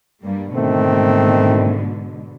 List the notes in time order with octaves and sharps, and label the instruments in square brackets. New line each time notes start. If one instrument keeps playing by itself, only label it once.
[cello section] G2 G3 A#3
[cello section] G#2 B2 D3 [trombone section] D#3 A3 C4